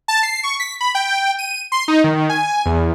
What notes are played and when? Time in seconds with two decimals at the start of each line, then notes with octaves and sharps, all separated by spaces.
0.08 A5
0.23 C7
0.43 C#6
0.60 B6
0.81 B5
0.95 G5
1.39 D#7
1.72 C6
1.88 D#4
2.04 D#3
2.29 G#5
2.66 E2